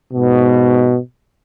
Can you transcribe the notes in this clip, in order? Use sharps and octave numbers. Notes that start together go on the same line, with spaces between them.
G#2 B2